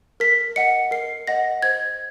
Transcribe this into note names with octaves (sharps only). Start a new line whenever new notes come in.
A#4 B6
D#5 F#5 C#7
A#4 C7
D#5 F#5 A#6
C5 G#6